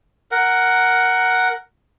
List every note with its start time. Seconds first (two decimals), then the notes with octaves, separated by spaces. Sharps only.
0.31 A#4 F#5